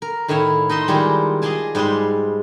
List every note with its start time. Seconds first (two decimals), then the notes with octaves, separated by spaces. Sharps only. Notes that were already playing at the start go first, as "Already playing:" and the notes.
0.02 A#4
0.28 A2 D#3 E4 C#5 F5
0.69 D#4 D#5 E5 C6
0.88 D#3 G3 G#3 E4 F4
1.42 G#4 D5 D#5 F5 G#5 A5
1.75 G#2 G3 G#3 B4 C6